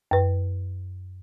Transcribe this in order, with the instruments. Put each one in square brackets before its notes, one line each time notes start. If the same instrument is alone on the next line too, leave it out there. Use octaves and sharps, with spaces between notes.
[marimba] F#2 B4